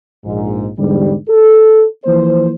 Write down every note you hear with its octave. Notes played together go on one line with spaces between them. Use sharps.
A#1 G#2
E2 G#2 D3 G3
A4
E3 F3 A#3 C5